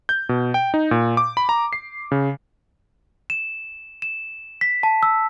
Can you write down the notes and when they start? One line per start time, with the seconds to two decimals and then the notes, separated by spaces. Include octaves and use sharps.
0.09 G6
0.29 B2
0.54 G5
0.74 D#4
0.91 A#2
1.17 D6
1.37 B5
1.49 A#5
1.73 C7
2.12 C#3
3.30 E7
4.02 E7
4.61 B6
4.83 A5
5.03 E6